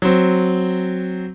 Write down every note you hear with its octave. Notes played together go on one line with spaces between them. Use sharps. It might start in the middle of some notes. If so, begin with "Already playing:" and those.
F#3 C4